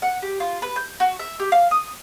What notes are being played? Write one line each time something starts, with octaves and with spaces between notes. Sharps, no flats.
F#5
G4
F4
B4
G6
F#4
E5
G4
F5
D#6